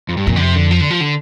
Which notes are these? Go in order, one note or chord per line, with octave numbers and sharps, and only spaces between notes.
F2
G2
F2 A#2
D3
C3
D3
F3
D3
F3
D3